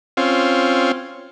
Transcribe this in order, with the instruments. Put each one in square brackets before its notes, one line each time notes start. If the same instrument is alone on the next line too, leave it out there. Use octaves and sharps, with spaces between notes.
[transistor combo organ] C4 C#4 F4